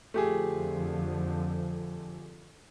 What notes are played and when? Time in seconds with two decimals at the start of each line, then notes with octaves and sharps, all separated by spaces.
0.14 F2 D3 F3 A3 G4 G#4